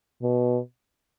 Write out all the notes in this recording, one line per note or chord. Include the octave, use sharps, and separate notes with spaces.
B2